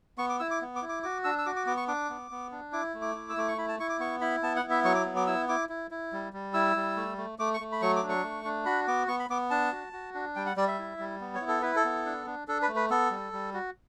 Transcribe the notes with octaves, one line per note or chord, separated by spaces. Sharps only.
B3 C#6
D6
E4 E6
D6
B3
D6
E4
D6
F#4 D6
D4 E6
E6
F#4 D6
D6
B3 D6
C#6
D4 D6
B3
B3
D4
E4 D6
A3
D6
E4
E6
A3 D6
C#6
E4 B5
A5
E4 C#6
D6
B3 C#6
E4 B5
B3 A5
F#5
E4
E5
F#3 C#6
D6
B3
D6
E4 E6
E4 D6
E4
E4
G3
G3
E4 E6
G3
A3
A3
A3 D6
C#6
A3
B5
F#3 C#6
D6
D4
C#6
A3
D4
F#4 B5
B3 D6
B3 C#6
B5
B3 D6
D4 A5
F#4
F#4
D4
G3 G5
F#5
G3 D5
E5
E4
G3
B3
C#5
E4
A4
E4 B4
A4
B3
D4
D4
D4 A4
B4
A3
B4
B3 A4
G3
G3
F#4